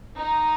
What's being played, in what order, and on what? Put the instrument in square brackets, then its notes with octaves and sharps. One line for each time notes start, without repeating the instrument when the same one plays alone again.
[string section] D#4